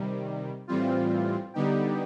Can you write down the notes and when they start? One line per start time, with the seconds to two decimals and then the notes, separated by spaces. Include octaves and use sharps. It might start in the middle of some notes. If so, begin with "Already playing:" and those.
Already playing: C3 D#3 G3
0.67 A2 E3 G3 C4 F4
1.54 D3 G3 B3 D#4 G4